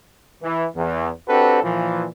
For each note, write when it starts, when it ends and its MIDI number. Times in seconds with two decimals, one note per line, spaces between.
0.43 0.66 52
0.76 1.09 40
1.29 1.58 60
1.29 1.58 62
1.29 1.58 66
1.29 1.58 67
1.29 1.58 69
1.29 1.58 71
1.63 2.06 46
1.63 2.06 52
1.63 2.06 53